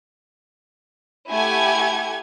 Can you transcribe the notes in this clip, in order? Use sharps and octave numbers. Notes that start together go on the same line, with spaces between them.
A3 E4 G4 F#5 G#5 G#6